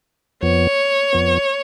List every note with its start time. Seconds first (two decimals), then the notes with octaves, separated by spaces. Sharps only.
0.43 F2 F3 B3 C#5
1.13 F2 F3 B3